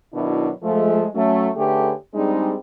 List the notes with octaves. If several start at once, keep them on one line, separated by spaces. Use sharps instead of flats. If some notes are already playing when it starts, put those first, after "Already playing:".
B2 D#3 F#3 D4 E4
F3 G#3 A3
F#3 A3 C#4
D3 A3 C#4 G4 G#4 B4
G3 G#3 C4 D4 D#4 G#4